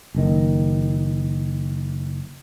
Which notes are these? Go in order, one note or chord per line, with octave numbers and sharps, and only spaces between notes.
F#1 D#3